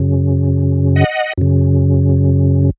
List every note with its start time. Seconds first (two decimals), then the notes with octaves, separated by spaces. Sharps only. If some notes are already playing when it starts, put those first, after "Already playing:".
Already playing: F#2 C#3
0.96 D#5 F#5
1.38 F#2 C#3